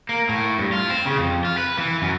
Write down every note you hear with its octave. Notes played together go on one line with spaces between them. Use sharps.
A#3
A2
G2
F4
C4
C#3
F2
F4
B4
E3
F#2